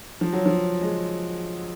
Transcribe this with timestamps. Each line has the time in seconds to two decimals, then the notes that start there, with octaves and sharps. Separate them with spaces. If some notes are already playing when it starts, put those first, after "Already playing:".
0.21 F3
0.33 F#3
0.46 F3
0.81 G#3